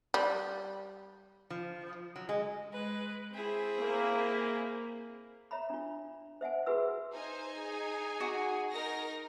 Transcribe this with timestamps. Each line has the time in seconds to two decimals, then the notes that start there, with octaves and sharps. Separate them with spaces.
0.14 G3
1.50 F3
2.16 F#3
2.29 G#3
2.71 G#3 B4
3.32 C4 E4 G#4
3.79 A#3
5.51 C#5 E5 A#5 B5
5.70 D4 F4
6.41 C5 E5 F#5 G#5
6.66 F4 F#4 G#4 B4 E5 E6
7.13 D#4 C5 G#5
7.54 G#4
8.20 F#4
8.71 D#4 A#4 A#6